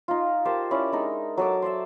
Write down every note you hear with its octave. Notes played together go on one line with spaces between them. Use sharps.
D#4 F4
G4 A#4 C5 A5
C#4 E4 D5
G#3 D4 D#4
F#3 A4 D6
C5 D5 E5